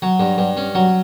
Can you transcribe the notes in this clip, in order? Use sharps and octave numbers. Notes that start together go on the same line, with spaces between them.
F#3
G2
G2
C#4
F#3